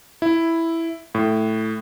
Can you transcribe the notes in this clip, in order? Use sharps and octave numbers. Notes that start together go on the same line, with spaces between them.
E4
A2